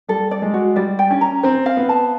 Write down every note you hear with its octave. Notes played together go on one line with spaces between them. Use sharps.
G3 A4
D5
G#3
F#4
G3 D5
G5
C#4
A#5
C4 C5
F5
B3
A5